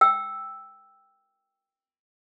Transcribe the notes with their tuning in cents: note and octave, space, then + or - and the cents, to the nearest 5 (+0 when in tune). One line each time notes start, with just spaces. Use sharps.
G5 +0 E6 +0